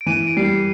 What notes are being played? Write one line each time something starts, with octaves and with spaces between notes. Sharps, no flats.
D7
E3 D#7
D7
G3 C7
C#7